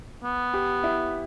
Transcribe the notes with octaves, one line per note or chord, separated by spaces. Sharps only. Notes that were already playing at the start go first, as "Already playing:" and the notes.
B3
G4
E4